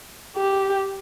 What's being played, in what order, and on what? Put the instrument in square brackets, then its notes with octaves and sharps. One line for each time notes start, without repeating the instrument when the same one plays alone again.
[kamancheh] G4